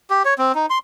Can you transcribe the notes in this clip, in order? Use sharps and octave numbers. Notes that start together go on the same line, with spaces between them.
G4
C#5
C4
D#4
C6